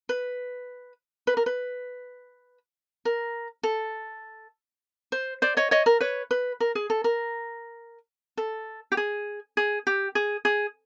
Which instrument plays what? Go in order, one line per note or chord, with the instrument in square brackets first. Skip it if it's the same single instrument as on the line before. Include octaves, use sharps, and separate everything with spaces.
[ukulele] B4
B4
A#4
B4
A#4
A4
C5
C5 D5
C#5 D#5
C#5 D#5
A#4
B4 C#5
B4
A#4
G#4
A4
A#4
A4
G4
G#4
G#4
G4
G#4
G#4